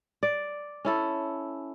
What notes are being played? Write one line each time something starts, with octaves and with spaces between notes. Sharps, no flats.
D5
C#4 E4 A4